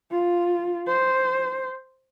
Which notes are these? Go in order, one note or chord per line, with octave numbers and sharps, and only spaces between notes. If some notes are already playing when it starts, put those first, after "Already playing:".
F4
C5